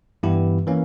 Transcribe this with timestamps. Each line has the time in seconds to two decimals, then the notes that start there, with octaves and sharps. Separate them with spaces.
0.23 G2 E3 B3 E4 G4
0.67 E3 A#3 C#4